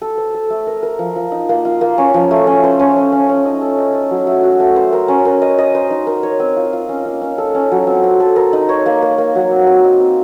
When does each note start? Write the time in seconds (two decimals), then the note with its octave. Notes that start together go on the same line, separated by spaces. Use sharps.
0.02 A4
0.18 C5
0.34 A4
0.50 A3
0.67 A#4
0.83 A#4
0.99 F3
1.16 F3
1.32 D#4
1.49 A#3
1.65 F4
1.81 A#3
1.98 C#4
2.14 F3
2.31 A3
2.47 C#4
2.64 C5
2.79 C#4
2.96 C#4
3.12 C#4
3.29 C#4
3.45 D#4
3.61 A4
3.78 D#4
3.94 A4
4.11 F#3
4.27 A3
4.43 F#4
4.60 A3
4.76 C5
4.93 A#4
5.08 C#4
5.25 A#4
5.42 D#5
5.58 D#5
5.75 C5
5.91 D#4
6.07 A#4
6.23 C#5
6.40 C4
6.57 F4
6.73 F4
6.89 C#4
7.05 A#3
7.21 C#4
7.38 A4
7.55 C#4
7.72 F#3
7.87 C4
8.04 C4
8.20 A4
8.36 A#4
8.53 D#4
8.69 C#5
8.86 A#3
9.02 A#3
9.18 A#3
9.35 F#3
9.51 C4
9.67 C4
9.84 D#4
10.00 C4